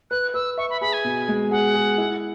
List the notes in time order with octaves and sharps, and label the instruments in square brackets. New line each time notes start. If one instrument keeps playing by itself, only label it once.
[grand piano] B4 [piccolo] F#6
[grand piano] B4 [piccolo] E6
[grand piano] E5 [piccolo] C#6
[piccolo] B5
[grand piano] G#4 [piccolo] B5
[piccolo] G#5
[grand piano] B2
G#3
[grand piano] G#4 [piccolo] F#5
[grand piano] G#4
E4